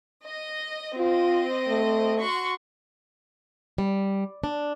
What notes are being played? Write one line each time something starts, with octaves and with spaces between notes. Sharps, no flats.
D#5
C4 F4 D#5
A3
F#4 C6 C#6
G3
D4